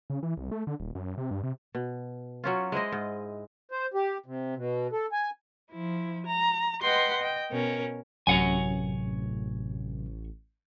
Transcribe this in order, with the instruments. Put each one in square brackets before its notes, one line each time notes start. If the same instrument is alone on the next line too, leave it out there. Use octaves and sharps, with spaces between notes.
[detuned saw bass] C#3
E3
C2
A3
D3
D#1
F#2
C3
G2
C3
[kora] B2
F#3 C#4 F4
G#3 E4 C5 D#5
G#2
[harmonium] C5
G4
C3
B2
A4
G#5
[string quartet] F3 E4
A#5
B4 D#5 F#5 G5 C6
D#5 G5
B2 C#4 A#4
[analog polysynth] A1 [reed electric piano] F#2 [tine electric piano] C3 F#3 [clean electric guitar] C#5 F#5 G#5